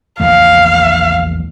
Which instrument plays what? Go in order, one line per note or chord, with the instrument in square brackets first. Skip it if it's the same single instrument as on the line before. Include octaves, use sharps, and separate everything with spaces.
[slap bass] A#1 E2 A3 [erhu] F5